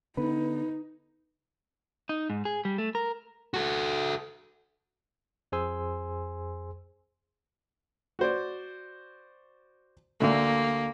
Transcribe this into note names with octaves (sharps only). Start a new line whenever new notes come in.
D3 B3 D#4 B4
D#4
G#2
G#4
G3
A3
A#4
F#4 A4
F2 G#4 C5 G#5 C6 E6
F#4 C5 D5
D2 D3 A3 A#3